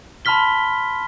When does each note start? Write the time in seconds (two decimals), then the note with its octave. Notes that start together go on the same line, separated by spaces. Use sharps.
0.25 A5 B5 C6 F6 B6 G7